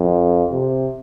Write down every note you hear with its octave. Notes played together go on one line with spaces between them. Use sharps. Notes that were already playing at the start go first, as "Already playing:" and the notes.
Already playing: F2
C3